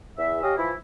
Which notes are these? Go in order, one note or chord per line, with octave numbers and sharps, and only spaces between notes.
E2 E5
G4 C#5 D#5 F5 G#5
E3 F3 E4